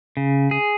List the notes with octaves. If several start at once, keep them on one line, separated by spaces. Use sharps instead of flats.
C#3
G#4